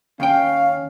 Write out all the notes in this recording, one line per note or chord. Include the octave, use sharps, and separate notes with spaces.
D#2 C#4 F5 G5